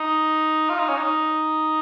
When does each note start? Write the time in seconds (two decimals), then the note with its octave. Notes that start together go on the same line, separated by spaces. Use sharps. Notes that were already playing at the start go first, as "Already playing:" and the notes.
Already playing: D#4
0.70 F4
0.79 D#4
0.89 C#4
0.98 D#4